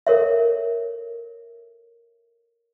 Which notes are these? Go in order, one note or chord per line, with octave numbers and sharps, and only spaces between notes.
A4 A#4 C#5 E5